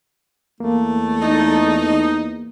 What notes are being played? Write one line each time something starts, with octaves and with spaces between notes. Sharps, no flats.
E2 A3 A#3
D#4